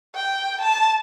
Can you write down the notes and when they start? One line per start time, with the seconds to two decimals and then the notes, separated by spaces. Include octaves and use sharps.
0.15 G5
0.61 A5